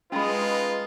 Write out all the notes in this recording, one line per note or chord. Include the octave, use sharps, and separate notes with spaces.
G#3 C#4 D#4 F4 B4 A#5 B5